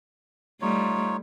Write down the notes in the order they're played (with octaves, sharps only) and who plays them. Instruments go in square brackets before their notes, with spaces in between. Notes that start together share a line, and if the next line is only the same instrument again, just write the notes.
[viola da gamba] G3 A3 [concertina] D#4 F4 C#5